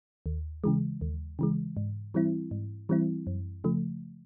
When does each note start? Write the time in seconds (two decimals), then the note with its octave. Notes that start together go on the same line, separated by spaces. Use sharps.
0.26 D#2
0.64 C#3 E3 G#3
1.01 D#2
1.39 C#3 E3 G#3
1.77 G#2
2.14 E3 G3 C4 E4
2.51 G#2
2.89 E3 G3 C4 E4
3.27 F#2
3.64 C#3 F3 A3